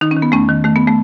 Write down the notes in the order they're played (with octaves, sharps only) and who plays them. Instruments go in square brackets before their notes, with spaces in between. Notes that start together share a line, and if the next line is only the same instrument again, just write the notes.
[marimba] D#3 D#4
C#4
D#3
B3
E2 A3 C#4
D#3
D#3 A3
B3
A3